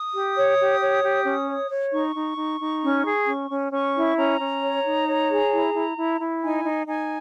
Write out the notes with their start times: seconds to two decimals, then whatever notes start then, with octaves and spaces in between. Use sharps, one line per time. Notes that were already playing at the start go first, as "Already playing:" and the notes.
Already playing: D#6
0.13 G4
0.36 C#5
0.59 G4
0.80 C#5
1.03 G4
1.25 C#4
1.47 C#5
1.70 C#5
1.93 D#4 C#6
2.16 D#4
2.37 D#4
2.60 D#4
2.83 C#4
3.05 G#4
3.27 C#4
3.51 C#4
3.72 C#4 C#6
3.95 E4
4.17 C#4 A#5
4.40 C#4
4.62 C#5
4.85 D#4
5.08 C#5
5.30 G#4
5.53 E4
5.74 E4
5.97 E4
6.20 E4
6.42 D#4 G#5
6.64 D#4
6.87 D#4 G#5